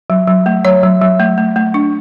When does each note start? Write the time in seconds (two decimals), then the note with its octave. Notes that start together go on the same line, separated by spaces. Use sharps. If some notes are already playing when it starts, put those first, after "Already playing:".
0.10 F#3
0.27 F#3
0.46 A3
0.65 F#3 C#5
0.83 F#3
1.01 F#3
1.19 A3
1.38 A3
1.56 A3
1.74 D4